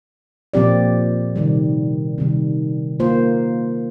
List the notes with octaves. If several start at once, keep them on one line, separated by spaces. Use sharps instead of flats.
A#2 F3 C4 G4 D5
C3 D#3 G3
C3 D#3 G3
A#3 F4 C5